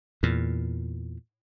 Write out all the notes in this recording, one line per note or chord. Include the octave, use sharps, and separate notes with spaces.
E2 A#2